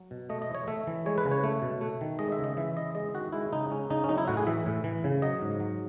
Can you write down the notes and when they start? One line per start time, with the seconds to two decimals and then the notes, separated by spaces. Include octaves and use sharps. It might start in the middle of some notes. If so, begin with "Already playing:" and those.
Already playing: F#3
0.11 B2
0.30 A3 D#5
0.42 D#5
0.49 E3
0.55 C#5
0.68 A3 E5
0.87 E3
1.06 G#3 C#5
1.18 B4
1.25 C#3
1.31 C#5
1.44 A3
1.62 B2
1.81 A3
2.01 D#3
2.19 G#3 D#5
2.32 E5
2.39 C#3
2.44 D#5
2.57 E3 E5
2.76 C#3 D#5
2.95 G#3 D#5
3.14 D#3 F#4
3.32 G#3 E4
3.53 C#3 D#4
3.71 G#3 C#4
3.90 C#3 D#4
4.04 C#4
4.09 F#3 D#4
4.18 E4
4.28 A2 F#4
4.37 G#4
4.47 E3 E5
4.66 A2
4.84 E3
5.04 C#3
5.22 F#3 D#5
5.41 G#2
5.60 F#3